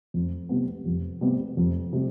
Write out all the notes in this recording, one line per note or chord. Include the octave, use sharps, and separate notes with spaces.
F2
C3 G3 B3
F2
C3 G3 B3
F2
C3 G3